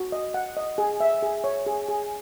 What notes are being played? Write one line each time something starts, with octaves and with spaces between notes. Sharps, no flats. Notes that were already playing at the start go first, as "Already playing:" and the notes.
Already playing: F#4
D#5
F#5
D#5
G#4
E5
G#4
C#5
G#4
G#4